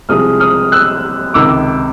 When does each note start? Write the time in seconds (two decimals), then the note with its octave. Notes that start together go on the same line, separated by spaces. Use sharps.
0.09 C2 C3 F3 G#3 D#6 F6
0.40 D#6 F6
0.72 E6 F#6
1.34 C#2 C3 D#3 D6 E6